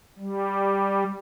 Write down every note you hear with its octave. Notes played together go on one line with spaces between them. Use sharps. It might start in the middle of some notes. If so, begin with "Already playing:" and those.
G3